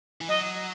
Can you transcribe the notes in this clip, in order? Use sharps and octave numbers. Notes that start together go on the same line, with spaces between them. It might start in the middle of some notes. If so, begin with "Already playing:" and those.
E3
F#3 D#5